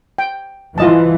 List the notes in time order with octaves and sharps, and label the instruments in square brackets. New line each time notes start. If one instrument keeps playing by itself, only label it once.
[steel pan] G5
[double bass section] E3 [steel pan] F4 D#5 A5